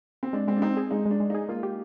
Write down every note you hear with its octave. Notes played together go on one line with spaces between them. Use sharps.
C4
G#3 D4
G#3 C4
D4
C4 D#4
G#4
G#3 D#4
G#3
D4
G#3
D#4 G#4
A#3 F4
G4